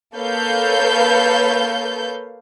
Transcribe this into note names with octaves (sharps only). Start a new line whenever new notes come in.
A#3 A4 B4 C#5 F5 G6